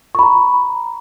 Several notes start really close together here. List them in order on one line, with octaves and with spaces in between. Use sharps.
C#6 B5 A#5